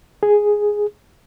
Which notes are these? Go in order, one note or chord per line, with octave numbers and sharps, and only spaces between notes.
G#4